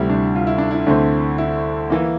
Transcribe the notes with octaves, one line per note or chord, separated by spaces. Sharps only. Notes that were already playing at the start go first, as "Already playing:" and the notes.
Already playing: D2 C3 G3 C4 E4
D4
F4
E4
D4
E4
D2 D3 A3 C4
E4
E3 A#3